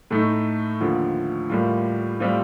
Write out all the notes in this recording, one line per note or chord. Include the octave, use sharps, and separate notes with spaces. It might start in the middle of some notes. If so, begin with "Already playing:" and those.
A2 A3 D#4
D#2 D3 F3
A2 G3 A#3 F4
A2 G3 C4 F4